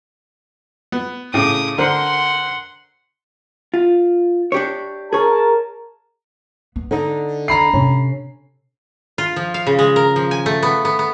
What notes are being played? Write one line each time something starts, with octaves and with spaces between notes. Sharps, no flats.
B3
A2 C#3 D6 D#6
D3 A#4 C5 F#5 C6
F4
D4 G4 C#5
G#4 A#4 C#5 A5
B3
D3 D4 D#4
A#5 B5 C7
C3 C#4 D4
F4
F3
F5
C#3
G#3
A#4
F3
G#5
A3
B3
B3
B3